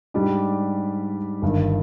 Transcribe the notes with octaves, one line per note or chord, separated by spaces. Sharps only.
G#2 G3 D4 G4
G1 G2 D#3